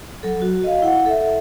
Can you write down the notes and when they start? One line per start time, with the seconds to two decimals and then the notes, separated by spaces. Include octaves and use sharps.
0.23 F#3 A4
0.42 F#4
0.64 D#5 F5
0.82 E4 F#5
1.06 A4 E5